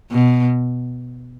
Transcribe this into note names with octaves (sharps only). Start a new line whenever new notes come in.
B2